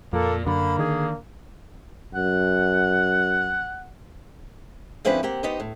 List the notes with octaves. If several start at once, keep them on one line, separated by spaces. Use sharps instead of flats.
F2 A#2 A#3 A4
F#2 D3 A#3 B5
D#3 G#4
F#2 F#5
D3 F3 C4 C#4 E4 B4
A#3 C4 G4 F#5
B3 D#4 G4 C5 D#5
A2